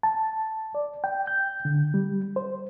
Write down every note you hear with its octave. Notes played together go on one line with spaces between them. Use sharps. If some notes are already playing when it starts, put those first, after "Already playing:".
A5
D5
G5
G6
D3
G3
C5